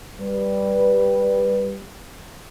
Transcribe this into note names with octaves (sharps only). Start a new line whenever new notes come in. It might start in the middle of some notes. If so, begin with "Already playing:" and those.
G3 B4